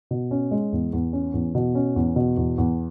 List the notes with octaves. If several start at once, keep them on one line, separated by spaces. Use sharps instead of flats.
B2
C#4
G#3
E2
E2
C#4
E2
B2
C#4
E2
B2
E2
E2